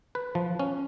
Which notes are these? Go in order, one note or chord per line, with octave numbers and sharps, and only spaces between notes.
B4
F3
C#4